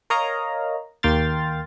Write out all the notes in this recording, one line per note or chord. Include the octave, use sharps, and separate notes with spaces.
A#4 C#5 D#5 F5 A#5
D#2 A#3 G5 C6 F6 A6